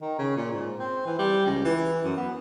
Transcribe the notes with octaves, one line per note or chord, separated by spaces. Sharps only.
D#3
C#3
A#2
G#2
C4
E3
G3
C#2
E3
F#2
B3